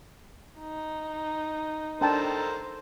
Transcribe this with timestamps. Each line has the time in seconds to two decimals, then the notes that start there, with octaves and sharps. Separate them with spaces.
0.59 D#4
2.01 D4 A4 A#4 C5 G5 A5